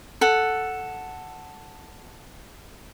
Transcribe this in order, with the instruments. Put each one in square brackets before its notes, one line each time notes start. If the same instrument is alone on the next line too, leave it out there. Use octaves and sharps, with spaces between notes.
[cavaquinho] A4 F#5